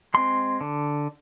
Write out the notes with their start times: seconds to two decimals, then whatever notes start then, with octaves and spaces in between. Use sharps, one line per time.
0.14 G#3 C4 C6
0.61 D3